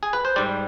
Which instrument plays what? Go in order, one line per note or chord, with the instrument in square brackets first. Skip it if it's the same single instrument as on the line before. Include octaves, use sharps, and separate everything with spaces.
[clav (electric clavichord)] G#4
B4
C5
G#2 G3 D5